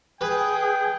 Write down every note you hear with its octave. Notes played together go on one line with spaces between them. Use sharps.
G#4 B4 G5